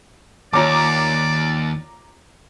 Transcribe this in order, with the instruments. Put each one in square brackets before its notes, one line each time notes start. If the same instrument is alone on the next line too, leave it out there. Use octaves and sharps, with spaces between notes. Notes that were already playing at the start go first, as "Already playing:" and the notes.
[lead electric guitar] D#2 [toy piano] F4 C#5 A5 [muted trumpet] D5 [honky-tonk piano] A#5 D6